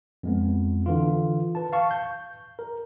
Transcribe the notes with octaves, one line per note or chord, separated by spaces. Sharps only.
F2 G#3 B3
D3 E3 F4
B4 A5
F5 A5 C#6
G6
A#4